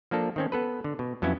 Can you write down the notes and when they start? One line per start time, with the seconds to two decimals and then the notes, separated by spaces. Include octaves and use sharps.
0.11 F3 A#3 D4 A4
0.36 D#3 C4 C#4
0.52 B3 A4 B4
0.84 D3
0.99 B2
1.22 F2 F#3 B3 C#4 E4